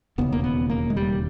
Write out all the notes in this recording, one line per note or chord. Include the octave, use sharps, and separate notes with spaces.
E1 D#2 C#3 B3
A#3
B3
A#3
G#3
G3